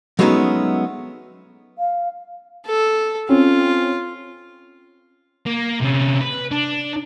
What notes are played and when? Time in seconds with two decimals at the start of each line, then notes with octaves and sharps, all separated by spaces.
0.19 F#3 G#3 A3 B3 C#4 D#4
1.78 F5
2.66 A4
3.29 C4 C#4 F4
5.46 A#3
5.81 C3 C#4
6.21 B4
6.51 D4